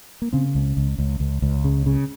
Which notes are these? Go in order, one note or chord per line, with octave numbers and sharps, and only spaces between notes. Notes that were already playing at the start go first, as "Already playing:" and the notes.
A#3
C#3 C4
C#2
C#2
C#2
C#2
C#2
C#3
C#3